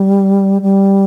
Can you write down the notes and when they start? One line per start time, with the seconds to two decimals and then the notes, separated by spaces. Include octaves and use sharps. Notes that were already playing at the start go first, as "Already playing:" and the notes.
Already playing: G3
0.62 G3